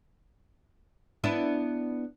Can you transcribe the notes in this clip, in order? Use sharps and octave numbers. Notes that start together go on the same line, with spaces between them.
B3 D4 E4